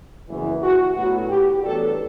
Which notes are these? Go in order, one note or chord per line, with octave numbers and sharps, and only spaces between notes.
F#1 E2 C#3 E3
F#4
A2 F#3 B3 D4 F#4
G4
A1 G2 F#3 B3 D4 A4